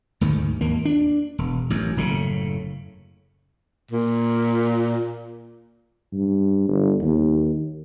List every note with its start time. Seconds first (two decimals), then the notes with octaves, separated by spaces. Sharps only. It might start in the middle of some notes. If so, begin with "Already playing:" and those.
0.21 D2 G#2 D#3
0.61 D#2 A#3
0.85 D4
1.38 E1
1.70 A1 F#2
1.97 F#1 A2 C#3
3.91 A#2
6.13 G2
6.69 G1
7.02 D#2